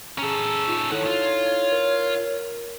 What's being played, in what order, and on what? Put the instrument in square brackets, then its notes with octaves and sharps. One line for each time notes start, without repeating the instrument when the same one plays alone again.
[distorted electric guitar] C#4 A4 [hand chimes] G#4 A#5
[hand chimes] D#4 F4
[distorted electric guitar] D#3 F#5 [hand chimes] D#4 E4 A4 [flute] C#5
[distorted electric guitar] F4
[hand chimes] A#4